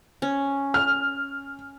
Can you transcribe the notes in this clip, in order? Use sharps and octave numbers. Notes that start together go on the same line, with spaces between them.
C#4
F6